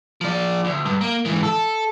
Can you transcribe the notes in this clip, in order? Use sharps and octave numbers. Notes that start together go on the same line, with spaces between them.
F3 D5
D2
G2
A#3
G#2 E3
A4